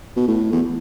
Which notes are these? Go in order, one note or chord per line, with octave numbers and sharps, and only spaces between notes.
B2
A2
E2